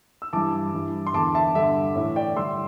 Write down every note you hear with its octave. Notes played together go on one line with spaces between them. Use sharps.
E6
G2 E3 A5 D6
G2 E3
C6
E2 D3 A5 D6
E5 A5
G2 D3 E5
A2 E3 E5
D5 G5
G2 D3 C6 E6